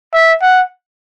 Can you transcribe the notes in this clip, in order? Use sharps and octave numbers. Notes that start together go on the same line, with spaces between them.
E5
F#5